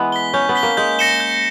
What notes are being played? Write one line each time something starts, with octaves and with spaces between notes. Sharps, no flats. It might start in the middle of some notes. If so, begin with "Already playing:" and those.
Already playing: E3 G#3 B3
B6 G7
C#4 G6
B3
B6 G7
A#3
G#3 G6
A#6 C#7 E7 G7
G6